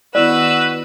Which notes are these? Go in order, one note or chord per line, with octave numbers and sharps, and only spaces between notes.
D#3 B3 E4 F#4 B4 D5 E6